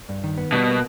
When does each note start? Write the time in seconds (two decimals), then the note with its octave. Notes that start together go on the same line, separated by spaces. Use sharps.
0.09 G2
0.24 D#3
0.38 B3
0.52 B2 G3
0.68 A#3